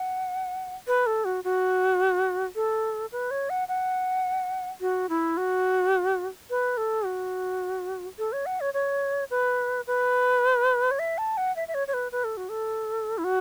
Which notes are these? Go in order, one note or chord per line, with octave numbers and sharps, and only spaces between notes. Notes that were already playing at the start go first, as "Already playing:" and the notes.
Already playing: F#5
B4
A4
F#4
F#4
A4
B4
C#5
F#5
F#5
F#4
E4
F#4
B4
A4
F#4
A4
C#5
F#5
C#5
C#5
B4
B4
C#5
E5
A5
F#5
E5
E5
C#5
C#5
B4
B4
A4
F#4
A4
E4
F#4